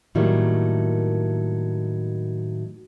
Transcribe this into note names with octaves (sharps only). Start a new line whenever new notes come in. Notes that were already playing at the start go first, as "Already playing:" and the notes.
A2 D#3 F#3 G3 A3 A#3